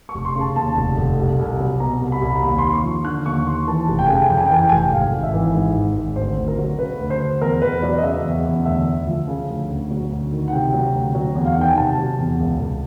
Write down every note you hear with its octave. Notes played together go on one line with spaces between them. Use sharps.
C#6
F1
C6
C#3
A5
D#2 A5
F1
F1
C2
C2
F#3
B2 A#5
C2
B5
C2
A#5
D#2 B5
C6
D#2
C#6
F3
D3 F#6
D#2 C#6
D#2 C6
E3 A5
F1
G5
C#3 G#5
G5
G#5
F2 G5
G#5
G5
E3 G#5
G5
F1 G#5
G5
G#1 F5
G#1
E5
E3
G#2
G#1
G#1
D2 C5
D2
A#4
F#3
C#3 B4
D2
C5
D2
E2 A#4
E2 B4
F#3 D5
D#5
C#3 E5
E2
E2
D2 E5
D2
F3
C#3
D2
D2
F#3
D2
D#3
F#5
C3 G5
F#3
D2
F#3
E2
F5
F#5
D#3 G5
G#5
C3 A5
F#3
E2
C#2
C#2